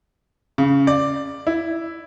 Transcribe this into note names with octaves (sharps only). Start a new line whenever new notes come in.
C#3
D5
E4